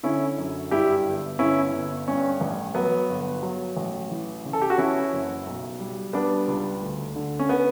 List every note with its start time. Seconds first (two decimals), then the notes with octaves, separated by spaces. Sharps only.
0.03 D3 C#4 E4
0.38 F#2
0.71 G2 E4 G4
1.06 G1
1.39 G1 C#4 E4
1.73 G1
2.07 G2 C#4
2.41 A1
2.75 F#3 B3
3.09 G1
3.43 F#3
3.77 A1
4.11 E3
4.45 C#3
4.53 A4
4.62 G4
4.70 F#4
4.78 E3 C#4 E4
5.13 F#1
5.47 B1
5.80 G3
6.13 G3 B3 D4
6.47 C#2
6.81 D2
7.16 D3
7.39 C#4
7.49 B3